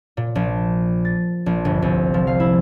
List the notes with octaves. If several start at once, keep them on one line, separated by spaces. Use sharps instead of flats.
A#2
A#1
A6
A#1
G1
C2
F3
F5
E4